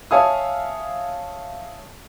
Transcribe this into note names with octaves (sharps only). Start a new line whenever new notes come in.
C#5 E5 F5 G#5 A5 D#6